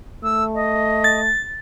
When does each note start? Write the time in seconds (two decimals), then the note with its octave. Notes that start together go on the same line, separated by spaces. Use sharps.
0.23 A3 E6
0.55 D#5
1.04 A6